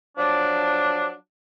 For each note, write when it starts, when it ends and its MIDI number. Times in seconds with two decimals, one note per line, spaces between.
0.18 1.11 53
0.18 1.11 54
0.18 1.11 62